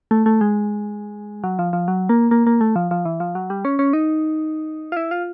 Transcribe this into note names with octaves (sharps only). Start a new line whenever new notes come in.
A3
A3
G#3
F#3
F3
F3
F#3
A#3
A#3
A#3
A3
F3
F3
E3
F3
F#3
G3
C#4
C#4
D#4
F4
E4
F4